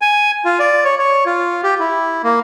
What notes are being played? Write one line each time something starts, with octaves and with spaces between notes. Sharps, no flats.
G#5
F4
D5
C#5
C#5
F4
G4
E4
A#3